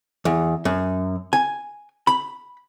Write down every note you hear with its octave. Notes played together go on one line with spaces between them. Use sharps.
E2
F#2
G#5
B5